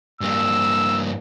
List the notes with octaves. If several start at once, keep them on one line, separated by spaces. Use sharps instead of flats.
G2 A#3 E6